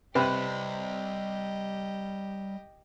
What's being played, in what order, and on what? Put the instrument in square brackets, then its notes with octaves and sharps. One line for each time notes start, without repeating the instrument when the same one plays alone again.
[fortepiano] C3 [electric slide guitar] G3 C5 D5 [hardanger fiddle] G4 D#5 [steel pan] B4